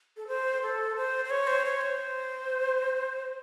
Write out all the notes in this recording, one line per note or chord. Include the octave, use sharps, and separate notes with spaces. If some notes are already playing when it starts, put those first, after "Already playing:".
A4
C5
A4
C5
C5
C#5
C5
C#5
C5